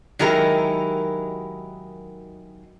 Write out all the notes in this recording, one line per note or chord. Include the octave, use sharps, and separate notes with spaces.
D#3 F#3 G#3 E4 G4 A#4